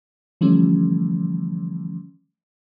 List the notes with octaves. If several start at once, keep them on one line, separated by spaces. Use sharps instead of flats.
D3 E3 F3 G3 A3 C#4